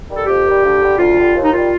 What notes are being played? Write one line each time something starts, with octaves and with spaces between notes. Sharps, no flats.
D#3 G3
A4
F2 G4
D#3 G3
D2
D3 G3
D2 F4
D3 G3
D#2
D#4
D#3 G3 F4